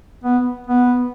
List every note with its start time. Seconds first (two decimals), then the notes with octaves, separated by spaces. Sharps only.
0.24 B3
0.67 B3